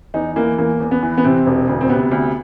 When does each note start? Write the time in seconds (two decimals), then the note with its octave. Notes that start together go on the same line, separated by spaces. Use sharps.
0.14 E2 D#4
0.36 E3 A#3
0.58 E2 A#3
0.80 E2
0.91 B3
1.03 E3
1.18 B3
1.24 C3 C4
1.46 E1
1.68 D2
1.81 C4
1.89 C3 B3
2.11 D2